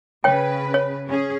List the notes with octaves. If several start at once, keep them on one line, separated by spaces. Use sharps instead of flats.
C#3 B4 C#5 G5
C#5
C#4 G#4